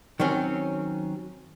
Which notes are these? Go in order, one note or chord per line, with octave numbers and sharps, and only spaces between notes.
D#3 F#3 C4 C#4